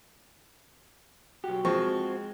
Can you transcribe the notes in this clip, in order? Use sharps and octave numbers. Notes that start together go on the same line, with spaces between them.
B1 F#4 G4
F3 G#3 C4 C#6